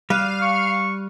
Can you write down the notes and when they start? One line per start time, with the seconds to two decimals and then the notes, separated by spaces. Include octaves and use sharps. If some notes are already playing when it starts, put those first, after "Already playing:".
0.10 G3 F5 F6 F#6 D#7
0.42 C#6